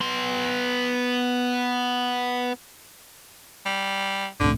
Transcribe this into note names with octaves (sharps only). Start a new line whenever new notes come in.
B3 C6
G3
G1 C2 A2 D3